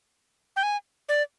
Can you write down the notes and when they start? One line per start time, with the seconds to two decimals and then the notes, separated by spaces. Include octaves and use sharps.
0.56 G5
0.63 G#5
1.09 D5